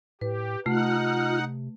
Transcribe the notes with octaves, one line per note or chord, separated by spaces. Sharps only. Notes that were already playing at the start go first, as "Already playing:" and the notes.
A2 G4 B4
C3 A3 D#4 F4 F#5 F6